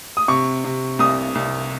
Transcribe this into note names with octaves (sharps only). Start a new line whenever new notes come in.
D#6
C3 C#6
C3
C2 D#6
C2